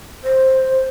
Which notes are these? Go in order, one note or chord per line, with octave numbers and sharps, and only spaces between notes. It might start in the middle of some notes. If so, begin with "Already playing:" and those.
C5